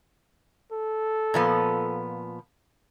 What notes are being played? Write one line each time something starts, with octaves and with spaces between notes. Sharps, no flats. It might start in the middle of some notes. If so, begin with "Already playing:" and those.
A4
A#2 F3 B3